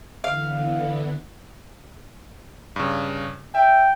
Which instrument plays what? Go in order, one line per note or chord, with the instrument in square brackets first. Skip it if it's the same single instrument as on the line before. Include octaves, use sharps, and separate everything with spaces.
[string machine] D3 E3 B3 [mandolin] F5
[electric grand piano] G2 C#3
[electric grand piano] E5 [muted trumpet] G5